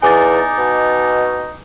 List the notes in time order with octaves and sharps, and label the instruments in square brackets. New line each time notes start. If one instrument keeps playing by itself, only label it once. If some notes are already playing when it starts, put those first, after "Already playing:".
[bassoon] E2 [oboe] D#4 [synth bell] G#5 D6 A6
[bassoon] B2